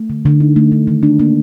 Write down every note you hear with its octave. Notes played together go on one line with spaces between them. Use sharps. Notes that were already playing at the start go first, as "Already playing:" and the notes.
Already playing: A3
D3
D3
D#4
A3
D3
D#3
D4
A#3